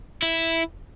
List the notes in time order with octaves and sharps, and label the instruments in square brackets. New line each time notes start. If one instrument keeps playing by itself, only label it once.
[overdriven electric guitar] E4